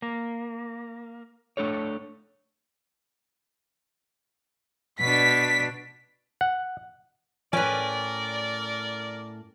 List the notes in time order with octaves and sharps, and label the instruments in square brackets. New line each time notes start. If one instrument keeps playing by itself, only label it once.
[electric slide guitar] A#3
A3 D4 A4 C#5
[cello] B2 D4 [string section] B6
[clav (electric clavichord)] F#5
[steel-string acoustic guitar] A2 G5 G#5 [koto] C#4 B4 [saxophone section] A#4 D5